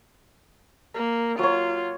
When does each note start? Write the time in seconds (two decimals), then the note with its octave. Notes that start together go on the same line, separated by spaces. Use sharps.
0.94 A#3
1.39 F#3 F4 C#5